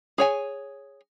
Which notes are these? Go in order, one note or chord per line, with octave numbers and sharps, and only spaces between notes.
G#4 C#5 G#5